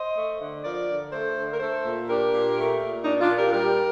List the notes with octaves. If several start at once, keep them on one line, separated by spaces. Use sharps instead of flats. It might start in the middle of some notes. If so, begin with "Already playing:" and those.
Already playing: C5 D#5
A3
D3
F3 A#4 D5
D3
A3 A4 C5
D3
A#4
A3 A4 C5
A#2
D4 G4 A#4
A#2
A3
A#2
D4 D#4
D4 F4
A#2
G4 A#4
G3 G4 A#4